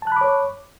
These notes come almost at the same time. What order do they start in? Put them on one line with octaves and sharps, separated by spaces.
A5 F#6 B5 D6 C#5